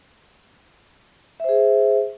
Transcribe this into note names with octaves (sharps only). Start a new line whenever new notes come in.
G#4 C5 E5